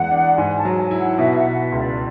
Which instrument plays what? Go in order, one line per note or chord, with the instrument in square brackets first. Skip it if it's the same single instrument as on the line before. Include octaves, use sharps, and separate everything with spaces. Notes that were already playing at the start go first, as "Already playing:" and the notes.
Already playing: [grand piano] E2 G#3 [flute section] F#5
[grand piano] D4
[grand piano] G#2 [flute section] G#5
[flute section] A5
[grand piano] F#3
[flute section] G#5
[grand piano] E4
[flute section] F#5
[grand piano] B2 [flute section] E5
[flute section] F#5
[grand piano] B2
[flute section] E5
[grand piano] C#2
[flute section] D5